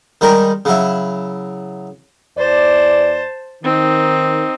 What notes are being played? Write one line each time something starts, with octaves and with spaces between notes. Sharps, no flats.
D#3 G3 G#3 A#4
C#3 F#3 E4
E2 C5 D5 A5
D#3 C4 D#4